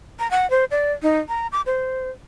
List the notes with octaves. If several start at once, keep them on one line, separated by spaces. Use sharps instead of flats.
A#5
F#5
C5
D5
D#4
A#5
D6
C5